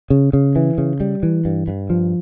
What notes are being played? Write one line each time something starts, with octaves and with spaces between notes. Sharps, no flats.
C#3
C#3
E3
C#3
G3
E3
G2
G2
F3